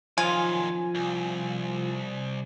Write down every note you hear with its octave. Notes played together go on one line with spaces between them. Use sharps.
F#2 D#3 F3 F4 G#5
C2